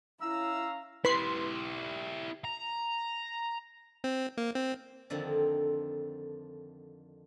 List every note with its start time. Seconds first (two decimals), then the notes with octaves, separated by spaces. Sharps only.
0.21 C#4 E4 F5 A#5 E6
1.05 E4 G4 B4 C6
2.44 A#5
4.04 C4
4.38 A#3
4.55 C4
5.10 F2 D3 D#3 F3 C4